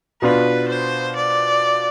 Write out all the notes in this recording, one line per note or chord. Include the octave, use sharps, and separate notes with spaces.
B2 B3 D4 F4 B4
C5
D5